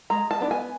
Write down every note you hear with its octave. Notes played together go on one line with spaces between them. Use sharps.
G#3 A#5
A5
B3 D4
G#5